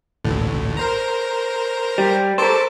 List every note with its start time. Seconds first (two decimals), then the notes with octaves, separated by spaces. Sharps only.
0.24 A1 D2 A2
0.77 A#4 C5 A#5
1.98 G3
2.38 A4 A#4 C5 A5 D6